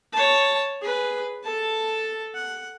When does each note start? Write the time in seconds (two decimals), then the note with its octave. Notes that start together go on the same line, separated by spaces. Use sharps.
0.13 C#5 A5
0.82 G#4 B4
1.44 A4 A5
2.35 F#5